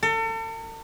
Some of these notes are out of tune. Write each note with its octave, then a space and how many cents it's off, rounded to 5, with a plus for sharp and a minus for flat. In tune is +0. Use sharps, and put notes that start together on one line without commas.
A4 +40